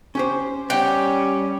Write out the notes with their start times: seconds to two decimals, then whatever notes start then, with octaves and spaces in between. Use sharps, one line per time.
0.15 C#4 G4 C5
0.70 G3 C#4 G4 D#5 F#5 G5